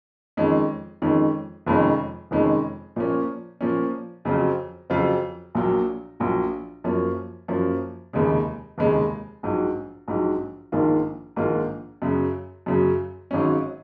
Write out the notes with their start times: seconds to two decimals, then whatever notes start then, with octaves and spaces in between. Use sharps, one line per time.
0.37 F2 D#3 G#3 C#4
1.02 F2 D#3 G#3 C#4
1.66 F1 F2 D#3 G#3 C#4
2.31 F1 F2 D#3 G#3 C#4
2.96 A#2 F3 A#3 C#4
3.61 A#2 F3 A#3 C#4
4.25 F2 C#3 F#3 C4 F4
4.90 F2 C#3 F#3 C4 F4
5.55 A#1 A#2 F#3
6.20 A#1 A#2 F#3
6.84 F#2 F3 A#3 C#4
7.48 F#2 F3 A#3 C#4
8.13 F1 D#2 C#3 G#3
8.78 F1 D#2 C#3 G#3
9.43 A#1 G#2 F#3
10.08 A#1 G#2 F#3
10.72 A#1 G#2 D#3 A#3 F4
11.36 A#1 G#2 D#3 A#3 F4
12.02 F#2 C#3 F#3
12.66 F#2 C#3 F#3
13.31 G#1 G#2 F#3 C#4